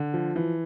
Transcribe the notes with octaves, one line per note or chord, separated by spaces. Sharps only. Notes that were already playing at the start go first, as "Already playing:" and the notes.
Already playing: D3
F3
E3